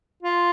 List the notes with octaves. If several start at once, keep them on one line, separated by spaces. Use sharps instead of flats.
F4